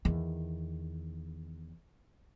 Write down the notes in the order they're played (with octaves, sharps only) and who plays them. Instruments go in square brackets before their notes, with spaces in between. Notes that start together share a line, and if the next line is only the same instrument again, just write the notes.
[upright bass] E2 D#3